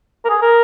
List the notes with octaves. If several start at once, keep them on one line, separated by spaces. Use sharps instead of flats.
A#4
G#4
A#4